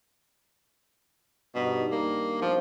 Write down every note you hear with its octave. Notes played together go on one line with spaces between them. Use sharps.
G2 B2 D#4
G2 D#3 A#3 D6
B2 F3 C4